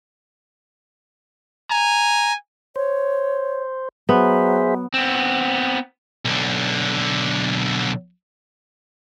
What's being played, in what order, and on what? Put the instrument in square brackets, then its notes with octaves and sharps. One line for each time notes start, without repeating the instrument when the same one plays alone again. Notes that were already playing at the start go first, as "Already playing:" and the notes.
[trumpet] G#5 [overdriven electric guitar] A#5
[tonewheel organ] C5 [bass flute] C#5
[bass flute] F#3 [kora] B3 [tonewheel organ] G#4 C5 E5
[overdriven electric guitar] B3 C4
[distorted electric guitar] B1 D3